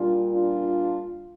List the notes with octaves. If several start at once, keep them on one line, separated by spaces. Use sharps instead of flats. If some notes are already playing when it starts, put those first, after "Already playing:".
Already playing: A#2 G3 D4 F4
D4 F4